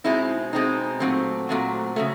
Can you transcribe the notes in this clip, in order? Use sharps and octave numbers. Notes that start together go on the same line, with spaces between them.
B2 G#3 C4 D#4 E4
B2 G#3 C4 D#4
A#2 F#3 A3 C4
A#2 F#3 A3 C4
C#3 F#3 A3